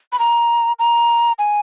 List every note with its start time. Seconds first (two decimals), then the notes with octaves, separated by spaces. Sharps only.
0.13 B5
0.19 A#5
0.79 A#5
1.39 G#5